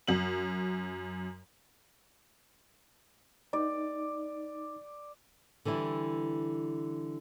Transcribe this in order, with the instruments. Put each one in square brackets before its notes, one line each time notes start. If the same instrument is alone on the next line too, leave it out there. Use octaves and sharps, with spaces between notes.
[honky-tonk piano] F#2 F#7
[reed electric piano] D#4 [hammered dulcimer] D5
[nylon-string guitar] D3 E3 G3 E4